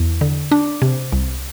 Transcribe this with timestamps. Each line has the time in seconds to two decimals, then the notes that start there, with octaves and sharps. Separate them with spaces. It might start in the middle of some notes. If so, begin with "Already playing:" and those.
Already playing: E2
0.21 D3
0.52 D4
0.82 C3
1.12 C2